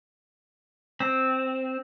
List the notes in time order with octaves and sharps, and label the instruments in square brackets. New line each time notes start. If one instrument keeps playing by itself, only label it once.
[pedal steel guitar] C4